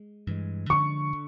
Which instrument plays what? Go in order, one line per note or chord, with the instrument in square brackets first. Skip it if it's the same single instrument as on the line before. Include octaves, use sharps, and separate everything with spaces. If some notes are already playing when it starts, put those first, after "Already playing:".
Already playing: [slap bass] G#3
G2 E3 G#3
[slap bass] D3 F3 G#3 [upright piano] C#6
[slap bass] D3